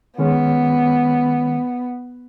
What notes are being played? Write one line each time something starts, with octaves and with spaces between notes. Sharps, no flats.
D#3 G#3 B3 C#4